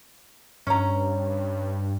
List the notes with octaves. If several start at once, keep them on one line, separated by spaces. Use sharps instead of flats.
G2 C#4 A#5